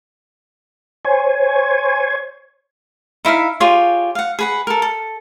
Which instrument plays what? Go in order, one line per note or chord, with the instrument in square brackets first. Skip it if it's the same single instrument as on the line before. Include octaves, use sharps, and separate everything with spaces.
[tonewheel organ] C5 C#5 G#5
[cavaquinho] D#4 E4 E5 F5
F4 G4 G#4 C#5
F5 F#5
G#4 B4 F#5
A4 A#4
A4